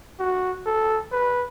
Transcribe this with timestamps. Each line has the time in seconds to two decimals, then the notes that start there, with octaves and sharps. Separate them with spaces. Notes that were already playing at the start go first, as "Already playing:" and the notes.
0.19 F#4
0.66 A4
1.12 B4